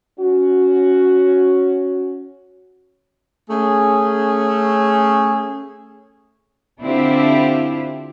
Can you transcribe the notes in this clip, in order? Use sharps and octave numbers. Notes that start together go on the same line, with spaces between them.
C#4 F#4
A3 C#4 G#4
D3 C4 D4 E4 F4 G4